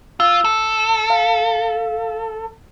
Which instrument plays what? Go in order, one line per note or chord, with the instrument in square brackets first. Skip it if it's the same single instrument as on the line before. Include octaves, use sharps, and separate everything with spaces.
[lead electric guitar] F4 [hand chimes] E6
[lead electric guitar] A4
[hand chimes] F5